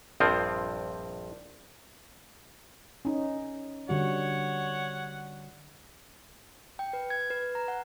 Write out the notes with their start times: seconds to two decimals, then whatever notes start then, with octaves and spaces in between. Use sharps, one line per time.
0.20 A#1 G2 F3 C4
3.05 C#4 D#4
3.89 D3 G3 F#4 C#5 F#5
6.79 G5
6.93 B4
7.10 G#6
7.30 B4
7.55 A#5
7.68 F#5